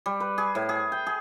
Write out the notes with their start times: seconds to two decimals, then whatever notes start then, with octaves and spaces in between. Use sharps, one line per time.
0.06 G3
0.20 B4
0.38 G#4
0.55 A2
0.69 G#4
0.92 G5
1.07 G#4